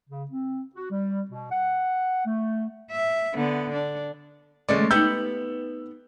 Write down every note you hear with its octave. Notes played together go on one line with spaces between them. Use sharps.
C#3
C4
F#4
G3
B2
F#5
A3
E5
D3 B3
D4
E2 D3 G#3 A3 C#4 D5
B3 D#4 G4 E6 G6